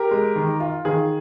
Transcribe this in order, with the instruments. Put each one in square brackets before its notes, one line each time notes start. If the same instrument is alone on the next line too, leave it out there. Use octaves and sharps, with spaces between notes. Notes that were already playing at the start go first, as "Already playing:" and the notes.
Already playing: [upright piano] G4 A#4
G#3
D#3
F4
D#3 G#4